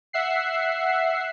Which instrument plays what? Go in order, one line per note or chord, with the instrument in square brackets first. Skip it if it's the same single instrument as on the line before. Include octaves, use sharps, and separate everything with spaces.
[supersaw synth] E5 F#5 C7